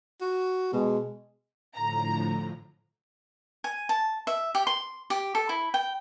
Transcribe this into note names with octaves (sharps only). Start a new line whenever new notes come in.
F#4
B2 G#3
A2 D3 F3 A#5
G#5
A5
E5
G4
C6
G4
A4
E4
G5